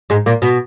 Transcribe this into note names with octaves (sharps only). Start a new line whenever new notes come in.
G#2 G#3
A#2 A#3
B2 B3